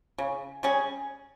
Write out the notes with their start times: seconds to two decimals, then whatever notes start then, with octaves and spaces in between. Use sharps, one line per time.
0.18 C#3
0.63 G3 C#4 G#4